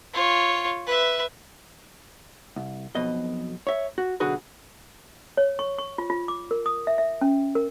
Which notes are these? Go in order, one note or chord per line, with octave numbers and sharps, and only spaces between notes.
F4 C#5
B4 E5
C2
B1 F2 B2 D#5
C#5 E5
F#4
B1 D3 F#4 G#4 B4
C#5
C#6
C#6
F4
F4
D6
A#4
D#6
E5
E5
C#4
A#4